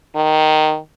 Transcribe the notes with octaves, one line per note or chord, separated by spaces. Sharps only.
D#3